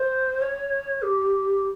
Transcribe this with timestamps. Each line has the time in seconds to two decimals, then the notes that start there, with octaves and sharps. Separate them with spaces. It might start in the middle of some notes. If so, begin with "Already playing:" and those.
Already playing: C5
0.41 C#5
1.02 G4